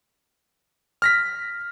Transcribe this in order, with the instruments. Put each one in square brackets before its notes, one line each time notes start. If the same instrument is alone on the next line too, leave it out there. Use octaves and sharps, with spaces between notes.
[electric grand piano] F6 A#6 B6